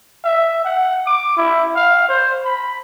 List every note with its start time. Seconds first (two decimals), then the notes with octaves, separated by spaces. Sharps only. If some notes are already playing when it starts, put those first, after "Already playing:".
0.24 E5
0.65 F#5
1.07 D6
1.37 E4
1.76 F5
2.09 C5
2.45 B5